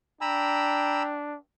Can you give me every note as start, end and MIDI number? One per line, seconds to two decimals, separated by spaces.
0.21 1.37 62
0.21 1.17 79
0.21 1.03 82
0.21 1.03 83
0.21 1.03 88